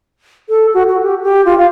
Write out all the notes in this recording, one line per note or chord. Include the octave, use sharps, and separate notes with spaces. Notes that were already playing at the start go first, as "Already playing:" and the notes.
A4
F#4
F#4
G4
G4
F4
F5